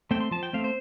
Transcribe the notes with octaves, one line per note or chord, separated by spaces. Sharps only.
A3 C4 G5
C6
F3 A5
G5
A3 C4 F5
C5